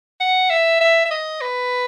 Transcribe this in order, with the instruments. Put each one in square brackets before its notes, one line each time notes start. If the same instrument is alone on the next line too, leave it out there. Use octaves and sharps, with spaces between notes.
[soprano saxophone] F#5
E5
E5
E5
D#5
B4